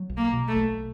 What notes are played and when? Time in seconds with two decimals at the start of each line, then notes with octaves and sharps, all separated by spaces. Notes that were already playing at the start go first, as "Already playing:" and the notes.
Already playing: F#3
0.10 B1
0.17 A#3
0.33 B2
0.48 A3
0.56 B1